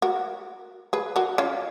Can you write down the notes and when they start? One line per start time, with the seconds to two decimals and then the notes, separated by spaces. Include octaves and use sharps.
0.02 F#4 A#4
0.93 G#4 B4
1.16 F#4 A#4
1.38 C#4 F4